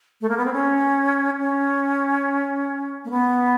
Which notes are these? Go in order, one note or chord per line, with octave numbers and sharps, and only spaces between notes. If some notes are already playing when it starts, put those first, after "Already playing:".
A3
A#3
B3
C4
C#4
C#4
A#3
B3